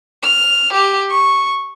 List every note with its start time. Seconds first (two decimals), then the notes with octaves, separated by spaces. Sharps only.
0.23 F6
0.73 G4
1.10 C#6